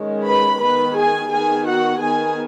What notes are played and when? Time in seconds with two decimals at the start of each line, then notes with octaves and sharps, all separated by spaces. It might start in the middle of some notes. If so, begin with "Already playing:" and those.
Already playing: D#3 G#3 C#4
0.26 B4 B5
0.61 D#3 B3 B4 B5
0.96 G#4 G#5
1.31 D#3 B3 G#4 G#5
1.66 F#4 F#5
2.01 D#3 B3 G#4 G#5